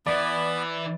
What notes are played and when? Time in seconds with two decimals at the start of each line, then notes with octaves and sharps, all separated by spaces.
0.07 E3 B3 D5 B5